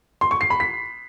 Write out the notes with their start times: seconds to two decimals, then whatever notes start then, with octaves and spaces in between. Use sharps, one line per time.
0.21 C6
0.31 C#6
0.41 C7
0.50 B5
0.60 B6